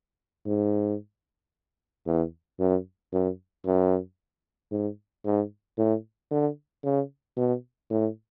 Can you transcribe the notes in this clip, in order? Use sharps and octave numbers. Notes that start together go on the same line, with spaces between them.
G#2
E2
F#2
F#2
F#2
G#2
G#2
A2
D3
C#3
B2
A2